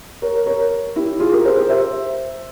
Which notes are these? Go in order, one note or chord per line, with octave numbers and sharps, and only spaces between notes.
A#4 C#5
A#4 C#5
E4 G4
F4 G#4
G4 A#4
G#4 C5
G4 A#4
C5 E5